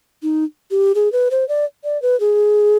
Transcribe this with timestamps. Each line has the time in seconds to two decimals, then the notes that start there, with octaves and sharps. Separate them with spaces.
0.23 D#4
0.71 G4
0.95 G#4
1.12 B4
1.31 C5
1.49 D5
1.84 D5
2.02 B4
2.20 G#4